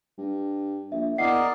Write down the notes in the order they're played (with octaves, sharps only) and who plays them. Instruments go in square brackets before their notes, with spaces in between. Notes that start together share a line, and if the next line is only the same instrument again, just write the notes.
[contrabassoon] G2
[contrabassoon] A#1 [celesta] E5
[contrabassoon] E2 [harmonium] A#4 D5 D#5 [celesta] F#5 C7